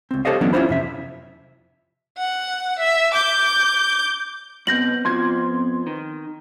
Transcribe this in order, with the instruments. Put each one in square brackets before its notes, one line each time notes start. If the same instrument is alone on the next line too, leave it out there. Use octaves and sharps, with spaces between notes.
[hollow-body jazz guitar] C#2 C4
G4 A4 C5 C#5 D#5 F5
D3 E3 F#3 B3 C#4 D4
C#4 E4 F4 C5 B5
F2 C3 E5
[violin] F#5
E5
D6 G6
[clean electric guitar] F#2 B2 [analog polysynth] B3 C4 [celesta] G6 A#6 F#7
[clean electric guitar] F2 F3 [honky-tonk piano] C6 G#6
[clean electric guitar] D#3